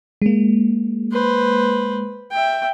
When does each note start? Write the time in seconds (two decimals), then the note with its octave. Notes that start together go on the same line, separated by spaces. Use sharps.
0.22 G#3 A#3
1.12 B4 C5
2.31 E5 G5